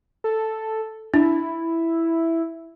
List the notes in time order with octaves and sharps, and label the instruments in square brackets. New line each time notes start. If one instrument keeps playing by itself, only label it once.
[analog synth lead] A4
[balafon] D4 [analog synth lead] E4